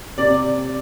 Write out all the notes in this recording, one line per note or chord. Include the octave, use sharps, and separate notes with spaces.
C3 D5